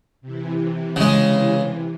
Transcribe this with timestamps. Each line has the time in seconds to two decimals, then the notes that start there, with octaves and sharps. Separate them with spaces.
0.21 C3 E3
0.96 C#3 G#3